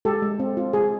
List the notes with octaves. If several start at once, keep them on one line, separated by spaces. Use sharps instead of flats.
G#3 G4 A4
G#3
C4
F4
G#3 G#4